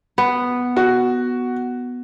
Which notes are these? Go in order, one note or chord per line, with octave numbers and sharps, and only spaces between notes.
B3
F#4